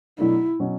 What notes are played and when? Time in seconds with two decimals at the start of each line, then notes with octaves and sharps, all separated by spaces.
0.18 B2 F#3 A3 D4 E4
0.59 B2 F#3 C#4